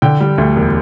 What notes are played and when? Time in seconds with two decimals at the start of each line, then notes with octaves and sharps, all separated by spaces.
0.02 D3 G5
0.21 G3
0.38 D2
0.56 E1